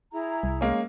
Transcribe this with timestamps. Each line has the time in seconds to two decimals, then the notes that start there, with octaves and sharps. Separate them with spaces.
0.13 E4 G#4 A#5
0.43 C2
0.61 G#3 A#3 C#4